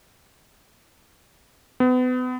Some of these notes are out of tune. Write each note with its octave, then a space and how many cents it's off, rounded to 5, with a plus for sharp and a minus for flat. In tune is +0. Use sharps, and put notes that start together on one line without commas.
B3 +35